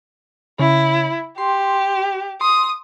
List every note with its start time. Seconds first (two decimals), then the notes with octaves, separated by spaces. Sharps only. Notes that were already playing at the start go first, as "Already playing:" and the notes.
0.59 C#3 E4
1.38 G4 C6
2.41 C6 D#6